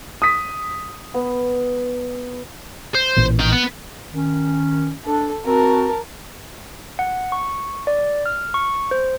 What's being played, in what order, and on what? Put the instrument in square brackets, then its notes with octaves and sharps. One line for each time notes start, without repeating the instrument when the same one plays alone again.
[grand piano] D#6 B6
[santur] B3
[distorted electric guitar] C5
[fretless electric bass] A1 A#2 E3
[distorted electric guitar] D#4 G5
B3
[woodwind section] D#3 C#4
[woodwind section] D4 [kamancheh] A4
[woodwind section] C4 F#4 [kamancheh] A#4 A5
[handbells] F#5
C#6
D5
F6
C#6
C5